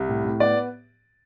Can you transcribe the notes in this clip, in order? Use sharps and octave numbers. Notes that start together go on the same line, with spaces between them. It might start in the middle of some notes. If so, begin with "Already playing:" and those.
Already playing: C2
A2
A2
B3 D5